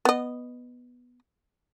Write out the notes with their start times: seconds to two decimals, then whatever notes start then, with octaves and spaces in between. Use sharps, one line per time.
0.05 B3 D#5